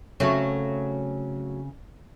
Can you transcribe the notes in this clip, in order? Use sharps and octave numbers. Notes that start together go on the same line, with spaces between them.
C#3 F#3 A3 C4 A4